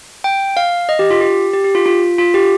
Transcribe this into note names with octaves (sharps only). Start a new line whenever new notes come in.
G5
F5
D#5
G4
F4
G4
G4
G4
F4
F4
F4
G4